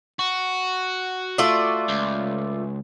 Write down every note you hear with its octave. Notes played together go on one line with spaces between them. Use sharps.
F#4
A3 F4 D5
C#2